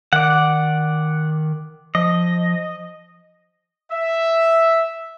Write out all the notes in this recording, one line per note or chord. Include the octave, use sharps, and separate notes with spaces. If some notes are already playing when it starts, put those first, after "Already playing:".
D#3 D5 F#5
F3 D#5
E5